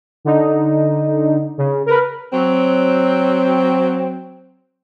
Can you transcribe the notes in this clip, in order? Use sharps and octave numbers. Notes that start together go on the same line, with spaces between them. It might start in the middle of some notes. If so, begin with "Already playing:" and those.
D3 D#4
C#3
A#4 B4
F#3 C4